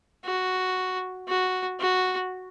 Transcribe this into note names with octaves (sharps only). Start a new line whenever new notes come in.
F#4
F#4
F#4